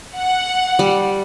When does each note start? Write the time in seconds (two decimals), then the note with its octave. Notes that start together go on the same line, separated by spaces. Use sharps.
0.17 F#5
0.79 G3